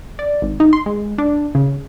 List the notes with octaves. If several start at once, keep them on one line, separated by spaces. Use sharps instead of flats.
D5
G#1
D#4
C6
G#3
D4
C#3